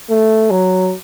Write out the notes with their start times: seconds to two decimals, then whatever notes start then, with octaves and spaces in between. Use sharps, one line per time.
0.10 A3
0.51 F#3